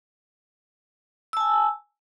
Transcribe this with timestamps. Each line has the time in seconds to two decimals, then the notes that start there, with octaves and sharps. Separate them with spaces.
1.33 E6
1.37 A5
1.40 G#5